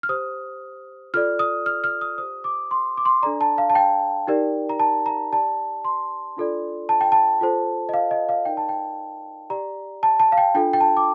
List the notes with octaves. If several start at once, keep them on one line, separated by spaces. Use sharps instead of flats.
F6
G4 C5 D#6
F4 A4 D5 F6
D#6
F6
F6
D#6
G4 C5 D#6
D6
C6
D6
C6
D4 A4 D5 A#5
A5
F5
A5
G5
D#4 G4 A#4 D5
A#5
A5
A#5
G4 D5 A5
C6
D4 F4 A4 D5
A5
G5
A5
F4 A4 C5
D#5
F5
D#5
F5
D#4 A#4 D5 G5
A5
G5
G4 D5 A#5
A5
A5
F5
G5
D4 F4 A4 G5
G5
A5
D6